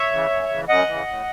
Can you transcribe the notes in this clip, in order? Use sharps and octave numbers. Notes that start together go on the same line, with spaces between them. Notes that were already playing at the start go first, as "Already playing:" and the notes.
Already playing: C#5 E5
C#3 E3
F#2
C#3 E3
F#2 D#5 F#5
C#3 E3
A2